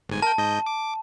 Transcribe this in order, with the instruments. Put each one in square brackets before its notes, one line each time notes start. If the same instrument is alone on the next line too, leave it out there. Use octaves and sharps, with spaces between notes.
[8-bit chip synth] G1 G#2 G#5
[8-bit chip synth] A#4 G5 [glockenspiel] A5
[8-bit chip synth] G#2 D#5 G6
D6